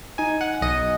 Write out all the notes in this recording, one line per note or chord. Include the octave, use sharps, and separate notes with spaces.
D#4 G#5
F#5
B1 D#5